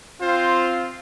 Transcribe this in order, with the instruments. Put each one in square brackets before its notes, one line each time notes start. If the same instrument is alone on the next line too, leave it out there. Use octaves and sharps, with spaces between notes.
[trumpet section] C4 F4 [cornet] C5